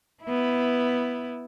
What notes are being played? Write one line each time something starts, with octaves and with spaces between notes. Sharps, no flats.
B3 E4